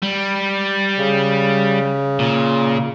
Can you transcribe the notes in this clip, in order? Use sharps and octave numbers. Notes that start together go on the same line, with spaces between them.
G3
C#3
A#2